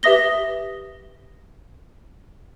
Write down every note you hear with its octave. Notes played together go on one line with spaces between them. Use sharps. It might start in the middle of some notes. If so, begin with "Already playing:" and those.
G4 B4 E5 D#6 A#6 G7